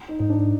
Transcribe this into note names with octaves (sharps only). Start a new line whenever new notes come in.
D#4
G#2 D#4
D4